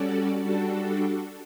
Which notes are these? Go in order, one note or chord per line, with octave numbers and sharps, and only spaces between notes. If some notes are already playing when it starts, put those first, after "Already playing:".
Already playing: G3 C#4 F#4 A4 D5
G3 D4 F#4 A4